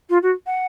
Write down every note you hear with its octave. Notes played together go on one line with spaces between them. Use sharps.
F4
F#4
F#5